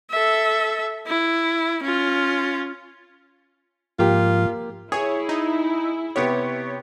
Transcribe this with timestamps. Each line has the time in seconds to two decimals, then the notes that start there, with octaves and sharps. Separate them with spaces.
0.11 A4 E5
1.07 E4
1.83 C#4 F4
3.99 G#2 F3 A#3 F4 G4
4.92 E4 G#4 C#5
5.29 D#4
6.16 C3 B3 G4 C#5